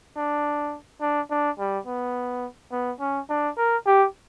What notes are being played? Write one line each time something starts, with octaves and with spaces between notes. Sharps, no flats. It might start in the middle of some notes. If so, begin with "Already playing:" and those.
D4
D4
D4
G3
B3
B3
C#4
D4
A#4
G4